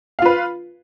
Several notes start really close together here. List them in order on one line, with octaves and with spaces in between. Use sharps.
F5 F4 B4